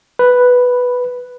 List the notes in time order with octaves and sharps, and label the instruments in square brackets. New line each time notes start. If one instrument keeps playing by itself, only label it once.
[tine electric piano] B4